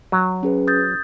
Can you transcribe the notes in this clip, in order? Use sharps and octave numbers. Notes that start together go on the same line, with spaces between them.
F#3
C#4 G#4 B4
D#6 G6 A6